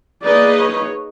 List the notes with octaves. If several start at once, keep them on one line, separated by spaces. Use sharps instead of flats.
A#3 D#4 G#4 B4 D5 D#5
C#5